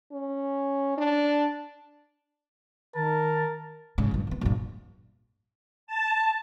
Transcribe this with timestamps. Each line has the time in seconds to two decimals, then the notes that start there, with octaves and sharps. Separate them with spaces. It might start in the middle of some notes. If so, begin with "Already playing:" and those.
0.12 C#4
0.98 D4
2.95 D#3 A#4 A5
3.98 G#2 C#3
4.11 A#1 G2
4.27 D#3 B3
4.41 A#1 G2
5.87 A5